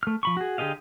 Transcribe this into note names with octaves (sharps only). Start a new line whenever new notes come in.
A3 F6
F3 B5 C#6
F#4 G#4
D3 G4 G#4 D#5 F5